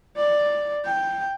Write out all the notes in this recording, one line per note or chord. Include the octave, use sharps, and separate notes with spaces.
D5
G5